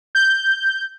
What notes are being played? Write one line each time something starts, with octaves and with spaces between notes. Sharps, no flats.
G6